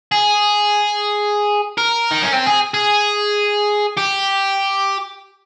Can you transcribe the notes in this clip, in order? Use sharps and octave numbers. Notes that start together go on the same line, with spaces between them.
G#4
A#4
D#4
C#4
C4
G#4
G#4
G4